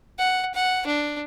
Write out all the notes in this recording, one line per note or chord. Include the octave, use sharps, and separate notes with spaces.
F#5
F#5
D4